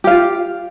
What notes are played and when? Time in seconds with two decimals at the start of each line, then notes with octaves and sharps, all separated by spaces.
0.04 G4
0.07 F5
0.10 F4